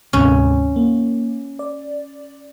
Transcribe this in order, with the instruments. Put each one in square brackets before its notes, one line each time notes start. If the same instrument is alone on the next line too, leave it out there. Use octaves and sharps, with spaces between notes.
[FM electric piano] D2 G#2 C3 [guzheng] C#4
[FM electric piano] A#3
D5